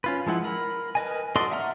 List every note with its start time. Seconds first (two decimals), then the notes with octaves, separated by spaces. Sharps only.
0.04 C#4 F4 B4
0.26 F3 G#3 E4 F#5
0.44 A#4 B5
0.95 A#4 B4 D#5 G#5
1.36 F#4 A4 D5 D#5 C6
1.51 E5 F#5 A#5 F6